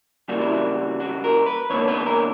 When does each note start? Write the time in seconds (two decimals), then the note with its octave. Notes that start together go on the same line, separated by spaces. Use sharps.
0.28 C#3 E3 G3 A#3 F#4
0.41 E4
0.54 F#4
1.00 F#4
1.24 A#4
1.46 B4
1.70 E2 D3 A#3 C#5
1.88 B4
2.06 A#4